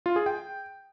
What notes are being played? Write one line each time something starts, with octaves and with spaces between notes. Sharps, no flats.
F4
G#4
G5